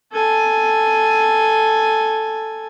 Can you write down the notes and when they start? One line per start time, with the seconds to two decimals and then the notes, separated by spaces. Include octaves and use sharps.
0.12 A4 G#5